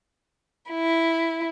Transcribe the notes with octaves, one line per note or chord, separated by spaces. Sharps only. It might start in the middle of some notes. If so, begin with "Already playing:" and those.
E4